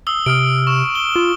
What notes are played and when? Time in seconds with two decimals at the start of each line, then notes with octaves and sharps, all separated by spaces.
0.07 D#6 E6 G7
0.26 C3 D#6 F6 D7
0.67 C#6 E7
0.95 G7
1.16 F4